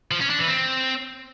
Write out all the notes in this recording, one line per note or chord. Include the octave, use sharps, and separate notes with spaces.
F3
C#4
D4
E3
C4